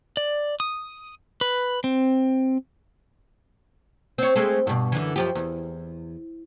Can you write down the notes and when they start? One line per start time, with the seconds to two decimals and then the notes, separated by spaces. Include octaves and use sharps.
0.17 D5
0.60 D#6
1.41 B4
1.84 C4
4.18 C4 C#5
4.36 G#3 A3 C4
4.67 G2 B2
4.92 F#2 D3 E3
5.16 F#2 F3 G4
5.35 E2